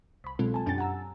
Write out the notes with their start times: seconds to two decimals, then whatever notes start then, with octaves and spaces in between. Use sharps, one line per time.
0.24 C2 B5
0.39 B2 F#3 G#3 C4 F4 A4
0.54 G#5 A5
0.66 F#2 C#4 D4 G4 G#5 A6
0.78 F#5 G#5 A#5 E6